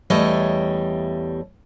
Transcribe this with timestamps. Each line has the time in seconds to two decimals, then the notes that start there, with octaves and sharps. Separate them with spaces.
0.10 E2 G3 A3 C#5 D#5